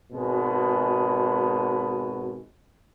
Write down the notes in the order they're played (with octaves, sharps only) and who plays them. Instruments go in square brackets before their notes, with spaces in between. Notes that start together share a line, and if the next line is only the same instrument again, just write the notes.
[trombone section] G#1 B2 G#3 F#4 B4